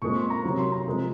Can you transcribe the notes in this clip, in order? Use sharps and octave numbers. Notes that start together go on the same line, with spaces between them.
A#2 G#3 C4 C#6
C6
A#5
C3 F#3 C4
C6
A#5
C3 F3 G#3